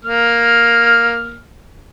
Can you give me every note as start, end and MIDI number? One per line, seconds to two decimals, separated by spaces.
0.05 1.40 58
0.05 1.40 89